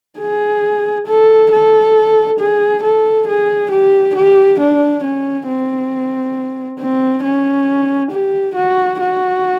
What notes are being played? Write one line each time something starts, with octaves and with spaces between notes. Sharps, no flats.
G#4
A4
A4
G#4
A4
G#4
G4
G4
D4
C#4
C4
C4
C#4
G4
F#4
F#4